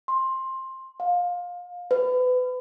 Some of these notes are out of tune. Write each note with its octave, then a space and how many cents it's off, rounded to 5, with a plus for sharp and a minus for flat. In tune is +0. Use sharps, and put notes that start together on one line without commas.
C6 +15
F5 +25
B4 +30